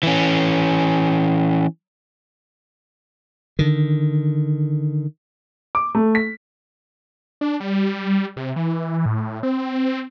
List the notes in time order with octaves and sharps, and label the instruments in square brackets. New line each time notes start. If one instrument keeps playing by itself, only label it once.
[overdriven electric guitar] E3 C#4
[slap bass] D3 D#3
[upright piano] D6
A3
B6
[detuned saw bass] D4
G3
C3
E3
A2
C4